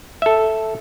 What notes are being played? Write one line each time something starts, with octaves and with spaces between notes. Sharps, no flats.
A4 E5